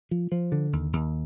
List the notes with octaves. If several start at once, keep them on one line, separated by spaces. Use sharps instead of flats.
F3
F3
D3
D#2
D#2